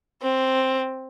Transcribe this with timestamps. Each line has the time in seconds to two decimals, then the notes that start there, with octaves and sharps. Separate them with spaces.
0.22 C4